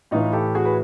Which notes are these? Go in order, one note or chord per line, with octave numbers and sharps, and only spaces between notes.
A2 E3 D#4 F4
G4 A4
F#4 G#4
B4